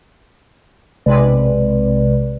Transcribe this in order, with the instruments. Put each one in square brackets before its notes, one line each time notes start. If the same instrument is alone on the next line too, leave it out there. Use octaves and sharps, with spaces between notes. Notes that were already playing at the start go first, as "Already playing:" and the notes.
[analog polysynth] B1 C3 G#3 B4 D5